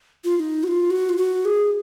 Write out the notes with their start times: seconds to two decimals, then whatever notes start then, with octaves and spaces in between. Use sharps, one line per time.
0.25 F4
0.36 F4
0.40 D#4
0.64 F#4
0.68 F4
0.90 F#4
1.09 F4
1.17 F#4
1.45 G#4